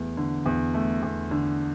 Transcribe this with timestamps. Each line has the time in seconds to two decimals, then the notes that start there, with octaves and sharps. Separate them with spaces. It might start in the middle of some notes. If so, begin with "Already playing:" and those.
Already playing: E2 A3
0.17 D3
0.46 E2
0.74 A3
1.03 E2
1.31 D3